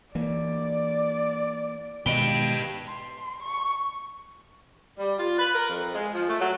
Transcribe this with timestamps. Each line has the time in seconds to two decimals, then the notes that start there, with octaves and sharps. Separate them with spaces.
0.15 E3 A#3 D5
2.06 B2 D#3 G#3 G4 B4 D#5 D7 G7
2.87 C6
3.42 C#6
4.99 G3
5.19 F4
5.38 B4
5.55 A#4
5.70 F2
5.95 G#3
6.14 F3
6.29 A3
6.41 F#3